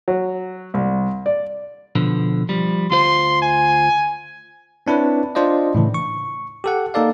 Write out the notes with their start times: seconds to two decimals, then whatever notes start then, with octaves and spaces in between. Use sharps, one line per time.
0.08 F#3
0.74 C2
1.26 D5
1.95 B2 D3 F3
2.49 F3 G3
2.90 D2 F4 C5 C6
3.42 G#5
4.87 C4 D4 E4 B4 C#5
5.35 D4 F4 C5 D5 D#5
5.75 A2 C#3 E3
5.94 C#6
6.64 G4 A4 F#5
6.94 A#3 D#4 A4 D5 F5